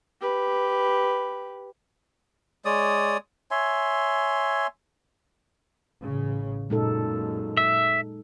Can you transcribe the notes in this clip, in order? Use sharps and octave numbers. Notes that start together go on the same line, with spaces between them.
G4 B4
G#3 C#5 D5 D#6
C#5 E5 G#5 C6
A1 C#3
F#2 A#2 G#3 D#4 A4
E5